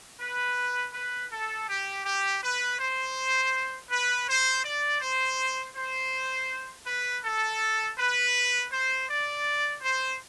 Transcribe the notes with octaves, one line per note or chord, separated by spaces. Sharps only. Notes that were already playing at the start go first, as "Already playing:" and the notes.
B4
B4
A4
G4
G4
B4
C5
B4
C5
D5
C5
C5
B4
A4
B4
C5
D5
C5